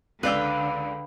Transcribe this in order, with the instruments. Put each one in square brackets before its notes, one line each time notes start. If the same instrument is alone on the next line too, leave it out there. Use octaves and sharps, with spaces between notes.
[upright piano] C#2 D5 E6 [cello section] D3 [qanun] B4 F5 G5